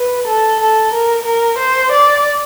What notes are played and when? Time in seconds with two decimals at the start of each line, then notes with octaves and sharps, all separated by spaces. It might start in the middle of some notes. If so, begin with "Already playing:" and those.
Already playing: B4
0.28 A4
0.60 A4
0.93 A#4
1.25 A#4
1.58 C5
1.92 D5